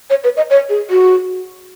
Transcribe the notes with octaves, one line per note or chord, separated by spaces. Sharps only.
C#5
B4
D#5
C#5
G#4
F#4